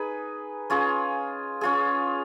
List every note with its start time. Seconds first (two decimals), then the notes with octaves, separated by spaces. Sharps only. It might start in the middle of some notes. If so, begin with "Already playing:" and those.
Already playing: D#4 G#4 B4
0.70 C#4 F4 G#4
1.61 C#4 F4 G#4